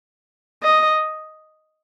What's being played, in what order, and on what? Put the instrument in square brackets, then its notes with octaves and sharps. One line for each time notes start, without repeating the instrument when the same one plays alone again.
[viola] D#5